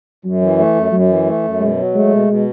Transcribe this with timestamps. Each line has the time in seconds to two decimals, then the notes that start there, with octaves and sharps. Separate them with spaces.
0.24 F#2 F#3
0.41 E3
0.58 A3
0.75 F#2
0.91 F#2 F#3
1.09 E3
1.26 A3
1.43 F#2
1.60 B2 G#3
1.77 F#3
1.94 G#3 A3
2.11 B2
2.28 B2